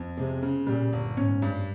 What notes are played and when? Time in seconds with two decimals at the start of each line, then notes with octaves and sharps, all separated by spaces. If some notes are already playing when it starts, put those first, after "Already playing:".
Already playing: F2
0.17 C3 G#3
0.43 C#3
0.67 A#2 G3
0.93 G1
1.17 G#2 C#4
1.42 G2